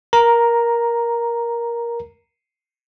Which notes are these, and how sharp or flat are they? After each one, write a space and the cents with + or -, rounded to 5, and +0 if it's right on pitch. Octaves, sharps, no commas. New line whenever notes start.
A#4 +15 A#5 +0